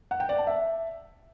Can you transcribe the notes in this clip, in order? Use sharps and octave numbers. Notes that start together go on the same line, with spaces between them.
F#5
G5
D5
A5
E5